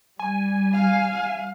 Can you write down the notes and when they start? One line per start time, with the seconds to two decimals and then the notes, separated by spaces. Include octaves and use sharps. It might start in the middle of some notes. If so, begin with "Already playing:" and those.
0.19 G3 G#5
0.73 F5